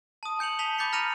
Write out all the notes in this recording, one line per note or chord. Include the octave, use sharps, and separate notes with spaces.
A5 D#6
G#5 G6 C#7 F7 F#7
A5 B6 F7 G7
B5 D6 G6 A6 B6 C#7
A#5 F6 A#6 C#7 D#7 F7